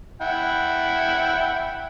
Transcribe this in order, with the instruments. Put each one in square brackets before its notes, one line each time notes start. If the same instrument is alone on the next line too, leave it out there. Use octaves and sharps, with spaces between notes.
[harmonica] E4 F#5 G5